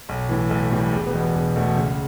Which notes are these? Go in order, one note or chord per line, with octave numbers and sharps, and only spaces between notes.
B1
A2 E3
B1 A3
A2 E3 G3
E1 G3
B3
E2 B2
B3
E1
E2 B2 A3
C#2